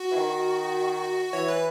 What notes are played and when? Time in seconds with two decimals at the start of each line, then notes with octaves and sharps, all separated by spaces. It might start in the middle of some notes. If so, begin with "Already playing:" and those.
Already playing: F#4
0.12 E3
0.17 D#3
1.33 E3 C#5
1.48 B4